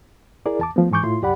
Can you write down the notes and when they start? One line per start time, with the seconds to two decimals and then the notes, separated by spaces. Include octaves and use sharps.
0.46 E4 G#4 A#4 D5
0.59 E2 A5 D6
0.76 F3 A3 B3
0.91 G#2 E3 G#5 C#6 D6 G6
1.03 A2 E4 F4 C6
1.22 C2 F#2 G4 D5 F#5 B5